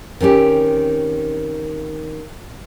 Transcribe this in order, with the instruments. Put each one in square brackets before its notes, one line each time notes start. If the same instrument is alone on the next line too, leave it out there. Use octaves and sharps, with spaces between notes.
[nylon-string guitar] D#3 C4 C#4 G4